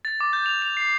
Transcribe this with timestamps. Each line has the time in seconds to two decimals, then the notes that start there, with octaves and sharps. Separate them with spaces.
0.05 A6
0.21 D6
0.33 G6
0.46 F7
0.62 F7
0.77 C7